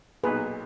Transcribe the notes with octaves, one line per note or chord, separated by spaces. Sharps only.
B1 A#2 F#3 B3 D#4 G#4 B4